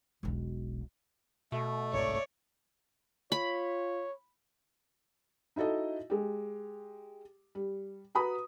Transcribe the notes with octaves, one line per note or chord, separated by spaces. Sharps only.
E1 B1
B2 A3
G1 C2 G#2 C#5 D5
F4 C#5 B5
D#4 E4 F#4 A4 D#5
G#3 G4
G3
F#4 B4 A#5 B5 D#6